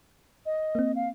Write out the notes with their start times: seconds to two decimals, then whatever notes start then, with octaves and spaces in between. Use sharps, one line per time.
0.46 D#5
0.75 A#3 C4
0.95 F5